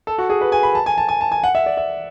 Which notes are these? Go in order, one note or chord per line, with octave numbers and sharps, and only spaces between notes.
A4
F#4
G#4
B4
G#5
B5
A5
G#5
A5
G#5
A5
G#5
F#5
E5
D5
E5